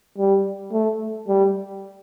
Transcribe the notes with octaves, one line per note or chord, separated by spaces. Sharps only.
G3
A3
G3